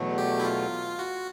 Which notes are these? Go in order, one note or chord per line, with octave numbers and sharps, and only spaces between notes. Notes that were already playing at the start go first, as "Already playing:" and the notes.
Already playing: E2 B2 F#3 A3
G4
E4
F4
F#4